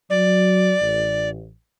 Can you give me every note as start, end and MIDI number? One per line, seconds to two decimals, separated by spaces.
0.10 0.74 54
0.10 1.29 74
0.81 1.48 33